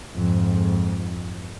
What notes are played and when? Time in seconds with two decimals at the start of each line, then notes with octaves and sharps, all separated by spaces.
0.13 F2 G#2